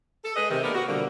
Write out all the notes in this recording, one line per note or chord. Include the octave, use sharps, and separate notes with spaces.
A4
G#3 G#4 B4 D#5
C3 D#3
A#3 B3 D4 G4 A4 A#4
F#4
B2 D3 F3 G3 A#3